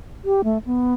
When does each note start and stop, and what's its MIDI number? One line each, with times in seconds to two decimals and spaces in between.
0.25 0.41 67
0.44 0.58 57
0.66 0.94 59